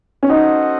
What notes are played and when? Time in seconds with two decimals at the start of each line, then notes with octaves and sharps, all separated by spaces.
0.23 C#4
0.29 D#4 F#4 A4 C5 D#5 F#5